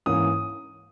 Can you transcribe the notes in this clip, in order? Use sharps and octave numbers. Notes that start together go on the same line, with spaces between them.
G#2 E3 A#3 C#4 D#6